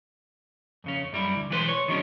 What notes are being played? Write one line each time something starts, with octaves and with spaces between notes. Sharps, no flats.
F2 C#3 C#4
F#2 G3 E4
D2
B1 E3 G#3 F4 B4 C5
C#5
D#3 F#3 G#3 A3 C#4 D4